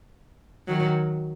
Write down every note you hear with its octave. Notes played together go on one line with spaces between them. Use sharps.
D#3 F#3